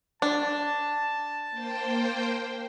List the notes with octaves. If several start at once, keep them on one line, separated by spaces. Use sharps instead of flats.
D4 A5
A#3 C5 G5